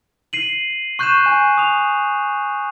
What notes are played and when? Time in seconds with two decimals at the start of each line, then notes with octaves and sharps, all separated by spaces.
0.33 C7 D#7 F#7
0.99 C#6 F#6 G6 C7 D#7 E7
1.26 G#5 G6
1.57 D#6 F7